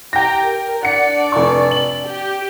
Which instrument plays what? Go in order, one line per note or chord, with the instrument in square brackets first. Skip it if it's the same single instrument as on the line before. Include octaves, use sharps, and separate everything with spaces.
[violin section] G4 A#5 [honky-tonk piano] G5 A#6
[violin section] A#4
[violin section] D4 D5 [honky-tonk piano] F#5 C#7
[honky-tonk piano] F1 C#6
F#7
[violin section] G4